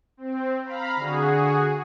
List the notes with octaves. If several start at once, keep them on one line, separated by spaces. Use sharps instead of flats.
C4
F5 A#5 B5
D3 F#4 G#4